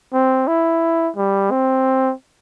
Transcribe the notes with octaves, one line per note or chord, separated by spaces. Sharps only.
C4
E4
G3
C4